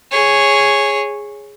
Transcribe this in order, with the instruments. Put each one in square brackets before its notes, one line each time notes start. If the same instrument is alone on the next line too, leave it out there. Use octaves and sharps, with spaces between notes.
[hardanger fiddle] G#4 C#5